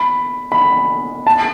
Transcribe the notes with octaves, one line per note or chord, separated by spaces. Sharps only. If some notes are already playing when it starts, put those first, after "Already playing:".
Already playing: B5
B5
A5